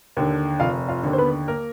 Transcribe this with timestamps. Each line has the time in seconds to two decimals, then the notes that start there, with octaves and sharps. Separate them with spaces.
0.17 D#2 D3
0.60 F1 F4 F5
0.89 F4 F5
1.03 D#2 D3
1.13 C5
1.18 B3 B4
1.48 A#3 A#4